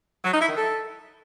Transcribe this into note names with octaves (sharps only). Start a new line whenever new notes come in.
F#3
D#4
E4
D#3
A4